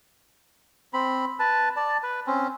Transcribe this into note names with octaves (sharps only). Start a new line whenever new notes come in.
C4 B5
B4 A5
D5 A5
B4
C4 C#4